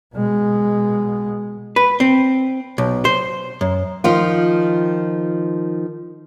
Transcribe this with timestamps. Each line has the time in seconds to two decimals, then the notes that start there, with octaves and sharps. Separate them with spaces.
0.15 B2 G#3
1.76 B4
2.00 C4
2.78 B1
3.05 C5
3.61 F#2
4.04 D#3 F3 F4